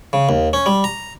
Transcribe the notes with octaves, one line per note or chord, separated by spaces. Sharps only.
C#3
D#2
C#4
G3
A#5